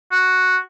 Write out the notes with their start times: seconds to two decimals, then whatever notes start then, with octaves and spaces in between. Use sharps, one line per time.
0.12 F#4